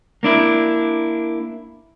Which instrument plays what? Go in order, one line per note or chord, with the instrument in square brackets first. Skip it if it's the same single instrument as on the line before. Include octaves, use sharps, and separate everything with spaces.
[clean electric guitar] A#3 D4 E4